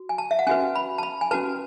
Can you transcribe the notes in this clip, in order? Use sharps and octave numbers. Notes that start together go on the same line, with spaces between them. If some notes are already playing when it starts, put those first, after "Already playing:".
Already playing: F#4
G#5
A5
E5
F#5
C#4 F#4 B4 G#5
B5
A5
B5
G#5
C#4 F#4 B4 A5